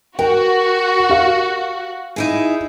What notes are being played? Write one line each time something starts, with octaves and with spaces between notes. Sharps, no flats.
F#4 A#4 G5
G4 F5
D#4 E4 G#4